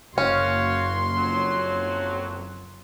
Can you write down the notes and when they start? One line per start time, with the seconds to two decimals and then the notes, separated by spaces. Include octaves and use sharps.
0.18 F#1 C#4 F#4 C#5 F5 C6
1.16 F2 F#3